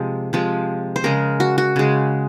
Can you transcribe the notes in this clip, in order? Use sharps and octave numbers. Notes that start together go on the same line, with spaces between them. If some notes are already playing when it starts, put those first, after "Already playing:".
Already playing: C3 F3 G#3
C3 F3 G#3
C5
C#3 G#3 A#4
F#4
F#4
C#3 G#3